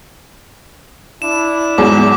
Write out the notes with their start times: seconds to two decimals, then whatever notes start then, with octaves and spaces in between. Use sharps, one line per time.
1.22 D4 E4 E7
1.78 E2 G#2 F#3 D6